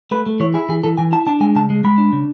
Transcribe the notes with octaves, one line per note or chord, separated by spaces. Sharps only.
A3 B4
A3
E3 C#5
E4 G#4
E3 G#4
E3 A4
E3 G#5
E4 A5
D4 A5
G#3 G#5
C#3 A5
G#3
G#3 B5
D4
C#3